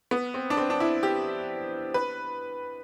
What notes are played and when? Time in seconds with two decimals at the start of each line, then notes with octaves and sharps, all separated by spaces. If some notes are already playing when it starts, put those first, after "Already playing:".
0.11 B3
0.34 C4
0.50 D4
0.57 C4
0.70 D4
0.80 E4
1.03 G4
1.94 B4